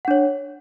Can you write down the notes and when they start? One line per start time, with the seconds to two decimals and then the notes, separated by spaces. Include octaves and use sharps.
0.05 F#5
0.08 D4
0.11 C#5